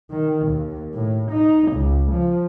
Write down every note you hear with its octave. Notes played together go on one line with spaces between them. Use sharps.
D#3
D#2
A2
D#4
C#2
F3